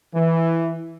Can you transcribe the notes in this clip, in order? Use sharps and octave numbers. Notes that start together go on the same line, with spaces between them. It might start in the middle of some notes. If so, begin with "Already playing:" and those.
E3